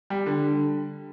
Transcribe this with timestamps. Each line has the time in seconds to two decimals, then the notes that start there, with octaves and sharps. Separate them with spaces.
0.10 G3
0.26 D3